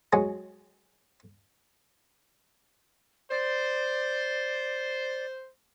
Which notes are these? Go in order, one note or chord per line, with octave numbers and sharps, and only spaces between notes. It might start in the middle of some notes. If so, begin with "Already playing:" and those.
F#3 G#3 C#4 G#4
C5 D5